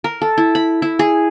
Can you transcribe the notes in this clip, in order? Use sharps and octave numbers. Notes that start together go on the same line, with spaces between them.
A#4
A4
E4
B5
E4
G#4